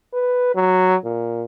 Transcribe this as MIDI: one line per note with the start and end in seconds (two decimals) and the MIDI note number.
0.13 0.52 71
0.55 0.96 54
1.05 1.44 46